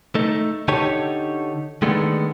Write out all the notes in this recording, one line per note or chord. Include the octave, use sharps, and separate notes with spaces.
A3 D#4
D3 D#4 G4 A4 C#5
D#3 G#3 A3 B3 D4